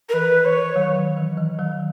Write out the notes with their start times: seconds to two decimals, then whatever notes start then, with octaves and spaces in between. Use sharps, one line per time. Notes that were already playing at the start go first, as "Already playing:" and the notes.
0.09 A#4
0.13 E3 B4
0.45 E3 C#5
0.75 D#3 F#3
0.96 D#3 F#3
1.17 E3
1.37 E3
1.59 D#3 F#3